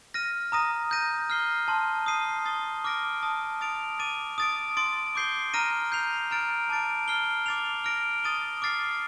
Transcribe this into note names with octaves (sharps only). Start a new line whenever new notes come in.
F6 A#6 D#7
A#5 D#6 A#6 D#7
G6 A#6 D#7
F6 C7 G7
A5 C6 F6
D#6 G6 C7 D#7
D#6 A6 C7 G7
D6 F6 A#6 D7
A5 D#6 A#6
D#6 A6 D7 F7
D6 A6 D#7
D#6 A6 D7
C6 D#6 A6 D7
D6 G6 C7 G7
A#5 F6 A#6 D#7
G6 C7 F7
A#5 F6 A6 D7
A5 D6 A6 D7
F6 C7 G7
D6 A6 C7 F7
F6 A#6 D7
D#6 A6 D#7 G7
D6 F6 A6 C7